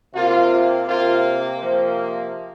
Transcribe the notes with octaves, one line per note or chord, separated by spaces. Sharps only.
C3 A#3 F4
C3 A#3 F4
C3 F3 A#3